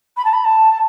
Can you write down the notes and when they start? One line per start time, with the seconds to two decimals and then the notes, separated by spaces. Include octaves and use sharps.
0.17 B5
0.24 A5
0.33 B5
0.44 A5
0.71 A5